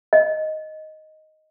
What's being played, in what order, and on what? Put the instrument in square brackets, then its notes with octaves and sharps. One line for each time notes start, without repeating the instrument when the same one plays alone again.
[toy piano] D#5